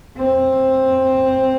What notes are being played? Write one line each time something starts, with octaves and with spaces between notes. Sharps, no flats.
C4